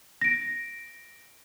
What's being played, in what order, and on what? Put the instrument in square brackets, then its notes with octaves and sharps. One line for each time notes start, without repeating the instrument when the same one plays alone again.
[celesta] A#6 D7